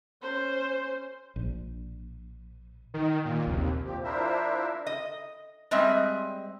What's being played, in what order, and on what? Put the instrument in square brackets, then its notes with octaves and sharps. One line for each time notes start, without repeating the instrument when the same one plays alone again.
[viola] C#4 C5
[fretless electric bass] A#1
[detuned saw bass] D#3
A#2
[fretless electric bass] A#1 C3 [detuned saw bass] D#2
[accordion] F2 A#2 F3 C4 G4
F3 D4 E4 A#4 C5 E5
[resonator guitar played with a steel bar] D#5
G3 G#3 C4 D#5 E5